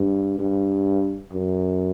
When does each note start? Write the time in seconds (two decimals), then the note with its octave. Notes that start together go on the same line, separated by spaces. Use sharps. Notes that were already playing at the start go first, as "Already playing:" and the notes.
Already playing: G2
0.39 G2
1.32 F#2